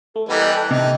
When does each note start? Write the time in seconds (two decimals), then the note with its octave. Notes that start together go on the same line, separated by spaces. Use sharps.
0.16 A3 A4
0.29 E3 G3 B3 A#4 B4 D#5
0.42 G5 B5 F#6
0.55 A5
0.71 C3 D#4 D#5